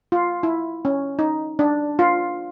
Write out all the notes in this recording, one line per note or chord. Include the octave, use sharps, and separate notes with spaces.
F4
E4
C#4
D#4
D4
F4